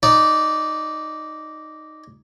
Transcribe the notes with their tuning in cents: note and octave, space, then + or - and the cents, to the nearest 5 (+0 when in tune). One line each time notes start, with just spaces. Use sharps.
D#4 -5 D5 -10